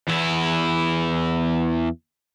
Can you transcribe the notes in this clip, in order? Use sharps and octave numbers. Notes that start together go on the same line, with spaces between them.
E2 E4